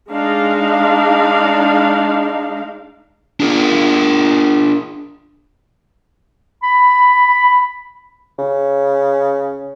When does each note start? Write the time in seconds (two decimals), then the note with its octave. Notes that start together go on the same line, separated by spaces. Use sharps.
0.11 G#3 D4 D#4 F5
3.40 D4 G#4 A#4
6.63 B5
8.39 C#3